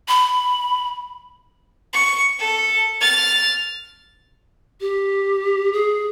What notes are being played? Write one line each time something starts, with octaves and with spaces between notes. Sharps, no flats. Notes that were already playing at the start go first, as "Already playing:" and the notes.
B5
C#6
A4
F6 A6
G4
G#4